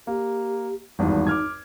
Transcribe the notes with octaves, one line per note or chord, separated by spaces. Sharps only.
A#3 G4
G#1 E2 G2 D#4
D6 F6 G#6